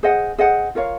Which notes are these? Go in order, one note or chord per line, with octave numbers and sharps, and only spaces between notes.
G#4 C5 D#5 F#5
G#4 C5 D#5 F#5
F4 A#4 C#5 F5